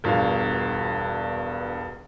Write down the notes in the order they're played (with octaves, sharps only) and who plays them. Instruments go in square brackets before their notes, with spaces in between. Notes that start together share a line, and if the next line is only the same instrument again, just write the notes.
[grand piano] E1 G2 B2 F3 F5